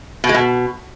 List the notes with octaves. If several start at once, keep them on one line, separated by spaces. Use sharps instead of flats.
B2
G#3
B2